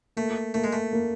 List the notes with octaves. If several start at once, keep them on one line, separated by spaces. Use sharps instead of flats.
A3 A#3
A3 A#3
G#3
A3
A#3